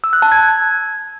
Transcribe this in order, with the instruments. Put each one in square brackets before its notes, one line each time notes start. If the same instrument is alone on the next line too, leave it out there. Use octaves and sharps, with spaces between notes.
[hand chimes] E6
F#6
A5
G#6